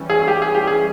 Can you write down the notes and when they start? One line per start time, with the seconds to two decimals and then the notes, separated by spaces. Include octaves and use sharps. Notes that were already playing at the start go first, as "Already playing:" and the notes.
Already playing: E3 G3 C#4
0.10 G#4
0.22 G#4
0.28 G4
0.42 G#4
0.55 G4
0.67 G#4